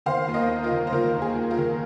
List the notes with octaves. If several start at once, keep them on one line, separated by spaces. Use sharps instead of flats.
D#3 C5 F5
D#2
A#4 D#5
D#2
F4 A#4
D#3
C5
D#3 F4 A#4
D#2
G#4
D#2
F4 A#4
D#3